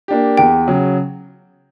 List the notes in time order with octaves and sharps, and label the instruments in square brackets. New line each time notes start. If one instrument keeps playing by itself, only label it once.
[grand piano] A#3 D4 G4
[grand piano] E2 [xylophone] G5
[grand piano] C#3 F#3